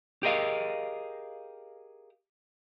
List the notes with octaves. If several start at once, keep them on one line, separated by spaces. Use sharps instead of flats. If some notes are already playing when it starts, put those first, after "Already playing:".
G4 G#4 A#4 D#5 F5